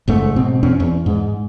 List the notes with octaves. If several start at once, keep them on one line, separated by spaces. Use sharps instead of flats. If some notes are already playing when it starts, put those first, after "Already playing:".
F#1 G#2 A3
B2 C4
E2 C4 C#4
E2
G#2